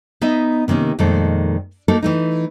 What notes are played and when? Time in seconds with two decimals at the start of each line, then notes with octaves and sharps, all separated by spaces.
0.21 B3 D#4 D#5 E5
0.68 C3 D#3 A#3 C#4
0.99 F2 A#2 D#3 G#3 A3 A4
1.88 A3 A#3 D#4 F#4 A4
2.02 E3 A3 D#4